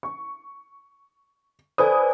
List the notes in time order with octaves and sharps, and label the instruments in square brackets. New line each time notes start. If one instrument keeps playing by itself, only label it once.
[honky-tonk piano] C#6
[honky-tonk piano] A4 B4 D#6 [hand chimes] C5 D5 G#5